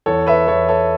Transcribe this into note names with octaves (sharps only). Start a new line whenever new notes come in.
E2 A4 C#5
B4 E5
E2 A4 C#5
A4 C#5